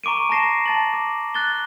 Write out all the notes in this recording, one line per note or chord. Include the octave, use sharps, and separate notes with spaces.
A#5 C#6 D6 D7 D#7
A5 A#5 C#6 A#6 C7 E7
A5 A6 F#7
D6
F#6 A6 G7